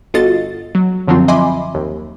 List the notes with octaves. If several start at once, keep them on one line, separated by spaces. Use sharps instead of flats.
G1 F4 F#4 A4 D#5 A6
F#3
F#2 D3 F3 F#3 C4 F4
D#5 E5 G#5 B5 C6 D6
D#2